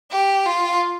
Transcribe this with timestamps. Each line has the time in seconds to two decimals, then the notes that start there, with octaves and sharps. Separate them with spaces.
0.11 G4
0.46 F4